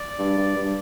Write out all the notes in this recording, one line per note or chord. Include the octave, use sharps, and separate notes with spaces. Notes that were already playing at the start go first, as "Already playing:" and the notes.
Already playing: D5
G2
G2
G2